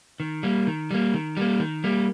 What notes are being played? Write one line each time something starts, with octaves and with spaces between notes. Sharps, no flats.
D#3
G3 A#3
D#3
G3 A#3
D#3
G3 A#3
D#3
G3 A#3